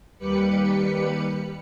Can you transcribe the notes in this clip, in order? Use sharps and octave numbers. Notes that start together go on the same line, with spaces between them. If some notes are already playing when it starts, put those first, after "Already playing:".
D#2 G3 G4 B4 B5 C#7